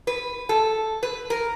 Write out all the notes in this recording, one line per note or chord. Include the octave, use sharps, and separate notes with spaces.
B4
A4
B4
A#4